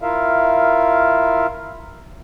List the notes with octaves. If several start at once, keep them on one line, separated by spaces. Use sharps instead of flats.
E4 F4 A#4 E5 F5